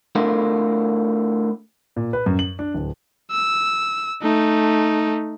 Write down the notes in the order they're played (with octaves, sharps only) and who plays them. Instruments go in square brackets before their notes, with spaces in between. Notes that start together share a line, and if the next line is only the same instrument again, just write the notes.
[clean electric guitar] A3 D4 E4 F4 A4 A#4
[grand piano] A#2
B4
F#2
F#7
D4
D1
[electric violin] E6
A3 D#4